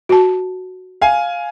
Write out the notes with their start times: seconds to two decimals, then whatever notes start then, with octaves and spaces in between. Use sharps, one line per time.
0.09 F#4 A5
1.01 F5 G#5